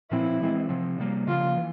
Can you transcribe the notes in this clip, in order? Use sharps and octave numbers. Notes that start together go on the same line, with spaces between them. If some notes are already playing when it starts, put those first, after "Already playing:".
A#2 F3 C4 E4
E3 G#3 C4
C3 F3 C4
C3 G3 A#3
C#3 F3 A#3 F4
E3